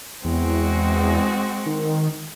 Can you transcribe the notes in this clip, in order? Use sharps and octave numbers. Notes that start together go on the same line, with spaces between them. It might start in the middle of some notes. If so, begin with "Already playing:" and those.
E2 G#3 C4 F#4
D#3